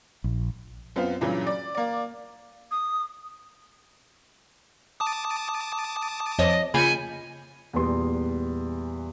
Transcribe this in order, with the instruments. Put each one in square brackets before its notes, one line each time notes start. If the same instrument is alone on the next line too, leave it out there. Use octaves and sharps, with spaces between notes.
[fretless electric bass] A#1
[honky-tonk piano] F#2 B3 C4 F4
G2 A#2 C#3 E3 F#3
D5
A#3 D5
[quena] D#6
[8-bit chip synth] A5 D6 D#6
[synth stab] F2 F3 C#5 [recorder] D#5
[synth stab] C#3 A#3 F4 [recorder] G#5 [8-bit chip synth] B5 G6 C#7
[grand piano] E2 A#2 G3 B3 C6